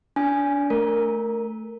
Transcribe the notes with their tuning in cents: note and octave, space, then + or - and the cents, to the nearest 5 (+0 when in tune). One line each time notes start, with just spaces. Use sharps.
D4 -30 G#5 +0
A3 +0 A#4 -5